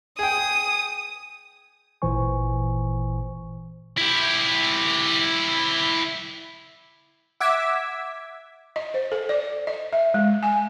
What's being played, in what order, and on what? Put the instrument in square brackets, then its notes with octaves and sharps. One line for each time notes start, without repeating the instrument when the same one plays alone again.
[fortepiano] G#4 G5 [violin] D#6
[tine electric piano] G#1 A#2 E3 C5 G#5 C#6
[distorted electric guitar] E4 G4
[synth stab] E5 F#5 D6 E6 G#6 B6
[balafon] D#5
C5
A4
D5
D#5
E5
G#3
G#5